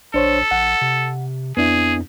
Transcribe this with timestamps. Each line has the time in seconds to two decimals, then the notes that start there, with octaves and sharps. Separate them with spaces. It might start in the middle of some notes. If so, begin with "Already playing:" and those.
0.14 A#1 D4 A4 C5 C#5
0.51 A#1 F#5
0.81 C3
1.57 F2 B3 D4 E4 G#4